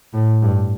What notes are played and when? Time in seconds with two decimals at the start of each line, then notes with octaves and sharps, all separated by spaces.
0.13 A2
0.42 G2